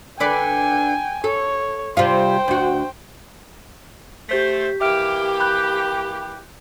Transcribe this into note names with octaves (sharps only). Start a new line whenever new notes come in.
D3 B4 D5 G5 G#5
A4 C#5
C3 G3 F4 C5 G5
D2 F#4
A3 G4 C5 G6 B6
E3 A#3 G4 E5 F6 D7
B5 F#6 G6